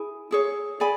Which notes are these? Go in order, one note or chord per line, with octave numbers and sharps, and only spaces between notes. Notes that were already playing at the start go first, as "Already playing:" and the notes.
Already playing: E4 G#4
E4 G#4 C#5
G#4 D5 G#5 B5